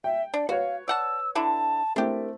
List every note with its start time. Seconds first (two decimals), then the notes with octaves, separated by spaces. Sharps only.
0.04 E5 G5
0.34 D4 D5
0.49 F#4 B4 C#5 F5
0.88 D5 F#5 A5 E6
1.35 D3 D4 E4 A5
1.96 A3 C4 D4 E4 G4 A#4